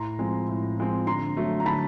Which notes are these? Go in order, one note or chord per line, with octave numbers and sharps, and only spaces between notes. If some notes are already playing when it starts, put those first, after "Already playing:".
Already playing: A2 A#5 C6
F3 G#3 C4
A2
F3 G#3 C4
D3 A#5 C6
F#3 A3
A#5
D3 A5 B5